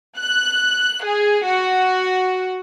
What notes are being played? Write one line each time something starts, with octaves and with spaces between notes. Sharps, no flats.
F#6
G#4
F#4